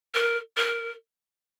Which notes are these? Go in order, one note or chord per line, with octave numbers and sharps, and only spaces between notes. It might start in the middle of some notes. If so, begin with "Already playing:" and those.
A#4
A#4